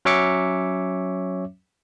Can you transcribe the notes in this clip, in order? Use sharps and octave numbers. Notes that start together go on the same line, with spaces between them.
F#3 C#4 C#5 E5 D6 C#7